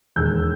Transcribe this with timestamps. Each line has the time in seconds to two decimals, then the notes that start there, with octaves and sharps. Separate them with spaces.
0.16 E1 D#2 D#3 E6 G6